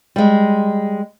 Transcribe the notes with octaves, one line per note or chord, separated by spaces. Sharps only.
G3 G#3